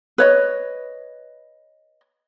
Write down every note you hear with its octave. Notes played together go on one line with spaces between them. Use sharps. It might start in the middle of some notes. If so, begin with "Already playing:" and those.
B4 C#5 D#5